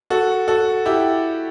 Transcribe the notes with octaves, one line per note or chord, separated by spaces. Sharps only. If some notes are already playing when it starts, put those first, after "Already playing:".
F#4 A4
F#4 A4
E4 G4